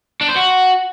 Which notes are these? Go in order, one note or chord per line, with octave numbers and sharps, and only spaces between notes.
D4
C5
F#4